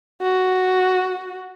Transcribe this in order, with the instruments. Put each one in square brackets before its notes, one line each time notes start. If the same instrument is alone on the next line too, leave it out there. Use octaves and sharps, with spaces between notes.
[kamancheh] F#4